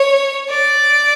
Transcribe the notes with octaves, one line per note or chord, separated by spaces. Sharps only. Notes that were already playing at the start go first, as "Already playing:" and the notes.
Already playing: C#5
D5